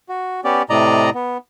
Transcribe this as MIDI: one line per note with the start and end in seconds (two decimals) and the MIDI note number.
0.09 0.40 66
0.44 0.62 59
0.44 0.62 61
0.44 0.62 67
0.44 0.62 74
0.70 1.10 45
0.70 1.10 48
0.70 1.10 74
0.70 1.10 75
0.70 1.10 82
1.14 1.37 59